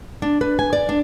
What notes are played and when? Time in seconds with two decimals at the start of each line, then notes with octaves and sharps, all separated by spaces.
0.22 D4
0.41 B4
0.59 G#5
0.73 D5
0.89 D4